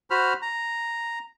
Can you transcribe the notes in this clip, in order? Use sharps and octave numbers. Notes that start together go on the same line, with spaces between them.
F#4 C5 B5 F6
A#5